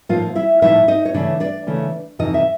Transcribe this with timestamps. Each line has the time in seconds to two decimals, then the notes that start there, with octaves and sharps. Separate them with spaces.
0.09 A2 F3 A#3 D#4 F4 F5
0.35 E4 E5
0.62 A2 F3 A#3 D#4 E4 E5
0.88 D#4 D#5
1.05 C#5
1.14 C#3 E3 A3 D4 D5
1.40 D4 D5
1.67 C#3 E3 A3
2.19 F2 C3 E3 D#4 D#5
2.34 E5